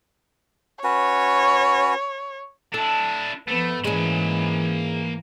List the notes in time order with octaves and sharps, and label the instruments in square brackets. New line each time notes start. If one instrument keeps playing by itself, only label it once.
[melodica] C#4 F#4 B4 [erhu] C#5
[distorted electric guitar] D4 E4 [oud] A4
[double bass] F3 B3 [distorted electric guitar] A3
[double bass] G#2 E3 [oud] G#3 C#4 [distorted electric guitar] A#3 B5